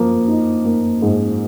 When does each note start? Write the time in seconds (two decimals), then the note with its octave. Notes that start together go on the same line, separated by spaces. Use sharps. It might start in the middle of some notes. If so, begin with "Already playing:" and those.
Already playing: F3 A#3
0.28 D#4
0.65 A#3
1.02 G#2